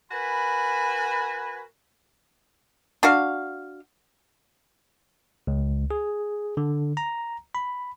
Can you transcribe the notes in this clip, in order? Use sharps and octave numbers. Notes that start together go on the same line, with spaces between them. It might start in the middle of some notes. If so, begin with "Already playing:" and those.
F#4 A#4 B4 G#5 B5
D4 F#4 F5
C#2
G#4
D3
A#5
B5